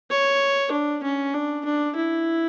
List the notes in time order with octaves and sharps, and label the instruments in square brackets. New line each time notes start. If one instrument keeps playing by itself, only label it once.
[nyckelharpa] C#5
D4
C#4
D4
D4
E4